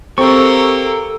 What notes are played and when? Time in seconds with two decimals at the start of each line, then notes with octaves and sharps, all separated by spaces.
0.18 A#3 C4 G4 A4 A#5 C#6 E6